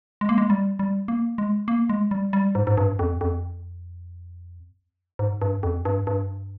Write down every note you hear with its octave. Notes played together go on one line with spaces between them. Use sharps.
G#3
A#3
G#3
G3
G3
A#3
G#3
A#3
G#3
G3
G3
G#2
G#2
G2
F2
F2
G#2
G2
F2
G2
G2